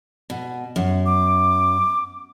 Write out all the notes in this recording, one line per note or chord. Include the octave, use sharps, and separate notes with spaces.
B2
F#2
D6